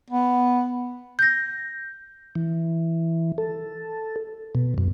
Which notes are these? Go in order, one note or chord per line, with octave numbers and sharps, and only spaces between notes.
B3
G6 A#6
E3
A4
B2
F#2